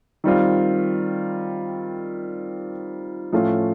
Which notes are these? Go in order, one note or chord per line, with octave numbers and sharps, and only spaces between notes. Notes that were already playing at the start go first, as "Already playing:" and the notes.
D#3 G3 C4 F4
A2 F3 A3 C#4 F4